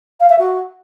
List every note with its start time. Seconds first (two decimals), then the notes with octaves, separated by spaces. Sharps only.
0.20 F5
0.29 E5
0.39 F#4